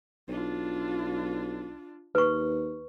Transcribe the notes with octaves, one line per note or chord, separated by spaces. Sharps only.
B1 D4 F4
D#2 B4 C#6